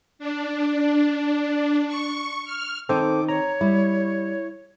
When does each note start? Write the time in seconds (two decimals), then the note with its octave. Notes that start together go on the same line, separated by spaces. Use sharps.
0.19 D4
1.87 C#6
2.45 F6
2.89 D#3 C4 D#4 A4 C5 D6
3.29 C#5 A#5
3.61 G3 E4